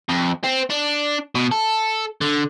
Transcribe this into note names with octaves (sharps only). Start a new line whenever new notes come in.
F2
C4
D4
B2
A4
D3